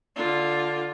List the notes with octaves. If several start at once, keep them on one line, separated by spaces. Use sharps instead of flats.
D3 F4